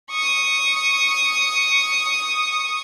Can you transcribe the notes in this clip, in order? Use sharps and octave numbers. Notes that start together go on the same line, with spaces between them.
C#6 D#6